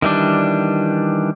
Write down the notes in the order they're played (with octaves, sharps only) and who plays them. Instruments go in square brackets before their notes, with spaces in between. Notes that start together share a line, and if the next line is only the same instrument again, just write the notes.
[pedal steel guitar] D#3 E3 G3 D4